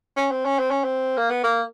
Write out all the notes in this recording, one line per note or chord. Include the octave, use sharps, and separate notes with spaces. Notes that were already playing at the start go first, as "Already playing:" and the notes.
C#4
C4
C#4
C4
C#4
C4
A#3
B3
A#3